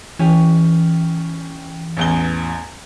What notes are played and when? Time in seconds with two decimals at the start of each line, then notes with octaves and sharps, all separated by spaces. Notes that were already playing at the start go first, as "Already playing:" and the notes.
0.19 E3 C#4 G4
1.97 A1 E2 G7